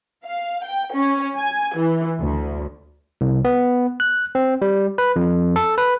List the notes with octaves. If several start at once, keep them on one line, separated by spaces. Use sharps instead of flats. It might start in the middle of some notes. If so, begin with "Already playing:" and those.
F5
G5
C#4
G#5
E3
D2
C2
B3
F#6
C4
G3
B4
F2
A4
B4